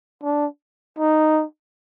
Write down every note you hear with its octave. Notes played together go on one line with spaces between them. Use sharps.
D4
D#4